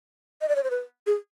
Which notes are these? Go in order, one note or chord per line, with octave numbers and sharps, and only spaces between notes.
D#5
D5
C#5
C5
B4
G#4